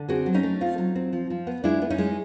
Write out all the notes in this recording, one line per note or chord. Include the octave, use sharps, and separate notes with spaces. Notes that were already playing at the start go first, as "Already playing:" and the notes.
Already playing: D3
C4 F#4 G#4
F#3
C#4 D#4
A3
C4 D#4 F4
F#3
C4
F3
F3
B3
G#3 D4 E4
B3
C#4 D#4
G#3